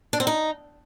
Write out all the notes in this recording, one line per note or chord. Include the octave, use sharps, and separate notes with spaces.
D4
C4
D#4